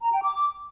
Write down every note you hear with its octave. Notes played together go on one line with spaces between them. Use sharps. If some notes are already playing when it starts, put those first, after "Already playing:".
A#5
G5
D6